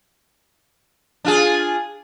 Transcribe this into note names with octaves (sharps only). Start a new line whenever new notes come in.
D4 F4 G#4